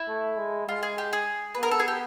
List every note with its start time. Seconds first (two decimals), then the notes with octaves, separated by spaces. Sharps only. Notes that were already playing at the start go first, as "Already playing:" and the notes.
Already playing: E4
0.08 A3
0.38 G#3
0.68 G#3 F4
0.83 G#4
0.98 G4
1.13 G#4
1.55 B4
1.59 B3 A#4
1.71 A4
1.80 G#4
1.88 G4